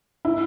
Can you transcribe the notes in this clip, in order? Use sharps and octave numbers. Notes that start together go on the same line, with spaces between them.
E4